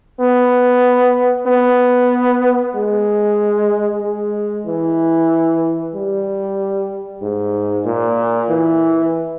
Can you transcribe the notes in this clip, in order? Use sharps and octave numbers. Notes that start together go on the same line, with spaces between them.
B3
B3
G#3
G#3
E3
G3
G#2
A#2
E3